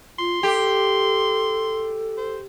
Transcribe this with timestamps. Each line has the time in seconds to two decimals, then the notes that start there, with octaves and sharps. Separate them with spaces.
0.19 F4 C6
0.43 G4 A4
2.18 C5